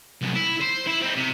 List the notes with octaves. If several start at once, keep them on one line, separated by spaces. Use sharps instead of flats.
C2 F#2
E4
C5
E4
C4 D#4
C3